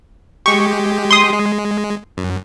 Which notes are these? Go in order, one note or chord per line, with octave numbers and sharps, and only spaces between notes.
G#3 G4 C#6
C6 D#6
G#3
F#2